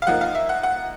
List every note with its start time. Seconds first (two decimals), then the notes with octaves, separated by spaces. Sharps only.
0.02 F5
0.07 F3 A#3 D#4 F#5
0.21 F5
0.35 E5
0.49 F#5
0.63 F#5